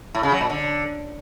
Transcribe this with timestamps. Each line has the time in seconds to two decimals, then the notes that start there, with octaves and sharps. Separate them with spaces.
0.15 A2
0.23 C#3
0.32 F#3
0.41 A#2
0.50 D3